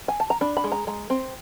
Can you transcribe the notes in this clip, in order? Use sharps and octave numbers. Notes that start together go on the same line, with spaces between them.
G#5
A5
A#5
D4 B5
B5
G#3
A#5
G#3 A#5
C4